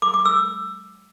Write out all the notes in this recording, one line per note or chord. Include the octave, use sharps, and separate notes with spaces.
D6
D6
E6